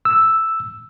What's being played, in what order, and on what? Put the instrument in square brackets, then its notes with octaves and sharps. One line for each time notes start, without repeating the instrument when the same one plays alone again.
[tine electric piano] E6